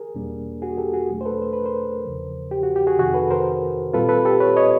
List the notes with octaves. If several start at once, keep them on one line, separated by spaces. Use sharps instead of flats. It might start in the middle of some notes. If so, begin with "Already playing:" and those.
Already playing: G#4 A#4
E2 B2 G3 A#3 D4
F#4 G#4
G4 A4
F#4 G#4
E2 B2 F#3 A3 D4
C5
A4 B4
C5
B4
A#4 C5
E2 C#3 F3
G4
F#4
G4
F#4 G#4
F2 C3 D#3 F#4 G#4
A4 B4
A#4 C5
A#2 G3 C4 F4 A4 B4
A4 B4
G4 A4
B4 C#5
C#5 D#5